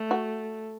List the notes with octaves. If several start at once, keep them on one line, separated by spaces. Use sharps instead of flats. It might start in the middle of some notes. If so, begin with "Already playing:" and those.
Already playing: A3
F#4